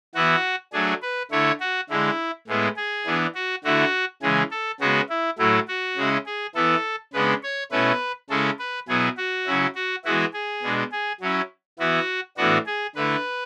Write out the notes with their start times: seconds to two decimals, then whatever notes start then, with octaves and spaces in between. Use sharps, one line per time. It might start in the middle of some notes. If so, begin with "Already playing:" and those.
0.15 E3 B3 E4 F#4
0.73 F#3 A3 D4 G#4
1.02 B4
1.31 D3 A3 E4 C#5
1.60 F#4
1.90 D3 G#3 D4 E4
2.47 A2 G#3 B3 E4
2.77 G#4
3.06 E3 B3 D4
3.35 F#4
3.64 D3 A3 E4 F#4
4.22 C#3 E3 G#3 G#4
4.51 A4
4.80 C#3 G#3 B3 F#4
5.10 E4
5.38 A2 F#3 A3 E4
5.68 F#4
5.97 C#3 G#3 C#4 E4
6.26 G#4
6.55 E3 B3 E4 A4
7.13 C#3 G#3 B3 D4 B4
7.43 C#5
7.71 B2 A3 C#4 E4 B4
8.30 C#3 G#3 C#4 E4 A4
8.59 B4
8.88 B2 F#3 B3 E4 G#4
9.17 F#4
9.47 C#3 F#3 C#4 E4
9.75 F#4
10.05 E3 G#3 B3 E4 F#4
10.34 G#4
10.63 B2 G#3 D4
10.92 G#4
11.21 F#3 C#4 E4
11.79 E3 B3 E4 F#4
12.37 A2 E3 B3 D4 F#4
12.66 G#4
12.96 D3 A3 E4 B4